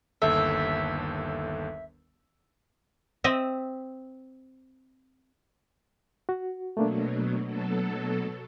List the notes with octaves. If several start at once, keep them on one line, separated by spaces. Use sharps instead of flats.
G1 D#2 A4 E5
C4 D#5 E5
F#4
B2 F#3 A3 A#3 D4
B2 F#3 A4